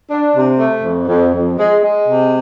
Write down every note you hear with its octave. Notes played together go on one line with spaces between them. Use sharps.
D4
C3
A3
F2
F2
F2
G#3
G#3
C3